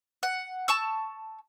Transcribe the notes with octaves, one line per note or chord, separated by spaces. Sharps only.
F#5
A5 C#6 E6